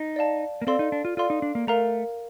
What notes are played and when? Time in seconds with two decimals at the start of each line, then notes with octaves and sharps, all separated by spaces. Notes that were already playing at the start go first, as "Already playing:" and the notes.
Already playing: D#4
0.16 D5 F5 A5
0.62 A#3
0.67 C4 A4 D5 F5 C6
0.79 D#4
0.92 D4
1.05 F4
1.17 F4 A4 D5 F5 C6
1.30 D#4
1.42 D4
1.55 A#3
1.67 A3 A#4 F5 A#5